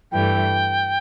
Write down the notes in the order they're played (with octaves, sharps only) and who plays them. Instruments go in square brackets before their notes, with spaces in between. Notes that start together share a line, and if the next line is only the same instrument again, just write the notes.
[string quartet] G2 E3 A3 [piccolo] G5